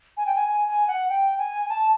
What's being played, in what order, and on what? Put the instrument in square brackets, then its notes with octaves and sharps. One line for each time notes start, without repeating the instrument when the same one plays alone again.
[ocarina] G#5
G5
G#5
G#5
G#5
F#5
G5
G#5
A5